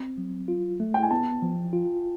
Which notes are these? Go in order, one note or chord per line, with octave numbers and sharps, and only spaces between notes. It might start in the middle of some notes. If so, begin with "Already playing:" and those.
Already playing: C4
F#3
F4
A3
G5
G#5
B3 A5
F3
F4